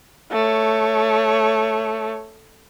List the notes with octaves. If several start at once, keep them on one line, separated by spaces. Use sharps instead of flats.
A3 C#5